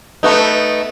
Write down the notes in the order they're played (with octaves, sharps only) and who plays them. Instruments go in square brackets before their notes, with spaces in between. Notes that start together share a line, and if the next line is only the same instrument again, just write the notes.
[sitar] A3 B3 D#4